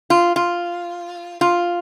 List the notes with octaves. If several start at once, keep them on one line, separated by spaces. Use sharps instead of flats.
F4
F4
F4